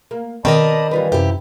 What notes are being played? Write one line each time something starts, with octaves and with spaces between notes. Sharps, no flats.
A#3
B2 D#3 C4 A#4 D5 D#5 A5 B5
G2 E3 G3 F4 B4
F#2 C3 E4 G4